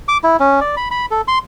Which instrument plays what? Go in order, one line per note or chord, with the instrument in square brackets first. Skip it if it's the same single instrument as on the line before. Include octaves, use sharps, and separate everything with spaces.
[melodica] D6
E4
C#4
D5
B5
B5
A4
C6